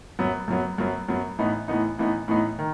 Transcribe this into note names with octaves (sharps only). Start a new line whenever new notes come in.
F#2 F#3 B3
F#2 F#3 B3
F#2 F#3 B3
F#2 F#3 B3
A2 E3 B3 D#4
A2 E3 B3 D#4
A2 E3 B3 D#4
A2 E3 B3 D#4
D#3